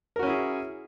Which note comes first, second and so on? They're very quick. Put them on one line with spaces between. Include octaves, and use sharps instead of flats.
A#4 F#4 C#4 E4 G#4